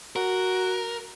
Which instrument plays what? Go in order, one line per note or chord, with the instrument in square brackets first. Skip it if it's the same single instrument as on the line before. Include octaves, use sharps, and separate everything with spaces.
[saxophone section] F#4 [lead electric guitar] A#4